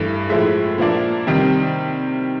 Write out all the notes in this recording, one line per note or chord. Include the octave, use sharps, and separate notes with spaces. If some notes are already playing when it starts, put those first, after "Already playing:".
Already playing: G2 E3 A3 E5
A2 F3 G#3 E5
A#2 F3 A#3 D4
C3 D#3 G3